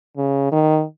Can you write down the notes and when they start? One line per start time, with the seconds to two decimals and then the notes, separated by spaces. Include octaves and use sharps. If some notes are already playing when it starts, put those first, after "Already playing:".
0.17 C#3
0.52 D#3